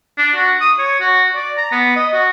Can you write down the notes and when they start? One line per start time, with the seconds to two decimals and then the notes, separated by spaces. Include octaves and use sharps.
0.18 D4
0.35 F#4
0.61 D#6
0.79 C#5
1.00 F#4
1.35 D5
1.57 A#5
1.72 B3
1.96 D#5
2.13 F#4